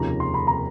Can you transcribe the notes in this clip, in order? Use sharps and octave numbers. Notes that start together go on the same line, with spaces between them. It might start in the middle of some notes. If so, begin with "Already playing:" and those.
Already playing: F1 D#2 C#3 F3 A#3 A#5
C6
B5
A#5